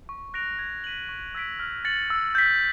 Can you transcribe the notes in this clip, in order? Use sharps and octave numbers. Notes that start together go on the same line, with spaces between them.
C#6
F#6 A#6 D7 F7
G#6
B6 D#7 F#7
C#6
E6 G#6 B6 D7
F6
A6 C#7 F#7
E6
G6 B6